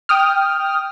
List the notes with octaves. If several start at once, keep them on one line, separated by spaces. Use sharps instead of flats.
G5 D#6 F6